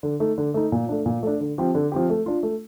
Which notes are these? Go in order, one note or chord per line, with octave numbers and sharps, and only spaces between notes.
D3
A3 D#4
D3
A3 D#4
A#2
A3 D4
A#2
A3 D4
D3
F3 C4 G4
D3
F3 C4 G4
A3
D4 F4
A3